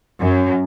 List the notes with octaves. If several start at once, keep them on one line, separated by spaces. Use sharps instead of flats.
F#2